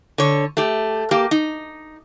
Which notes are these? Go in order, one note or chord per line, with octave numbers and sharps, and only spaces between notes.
D3 C#5
A3 G4
A#3 G4
D#4